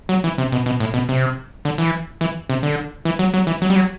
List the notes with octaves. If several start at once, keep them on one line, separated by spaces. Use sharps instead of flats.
F#3
E3
C3
B2
B2
A2
B2
C3
D3
E3
E3
C3
D3
E3
F#3
F#3
E3
F#3
G3
F#3